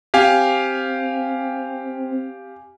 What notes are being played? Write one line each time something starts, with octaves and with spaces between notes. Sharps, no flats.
C4 G4 F5 G#5